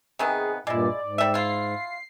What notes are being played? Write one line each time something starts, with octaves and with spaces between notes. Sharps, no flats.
C3 D#3 B3 G#4
G2 A#2 G#3 E4 D5
G#2
G3 E5
E4 F4 C7